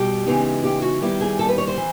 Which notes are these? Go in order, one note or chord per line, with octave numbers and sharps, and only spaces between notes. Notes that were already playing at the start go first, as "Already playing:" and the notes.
Already playing: B2 G3 G4
C#3 E3 G#3 B3 D#4
G4
F#4
D#3 G3 B3 E4 G4
G#4
A4
B4
C#5
C5
E3